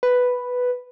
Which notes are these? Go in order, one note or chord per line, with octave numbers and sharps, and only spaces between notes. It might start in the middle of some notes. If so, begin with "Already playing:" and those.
B4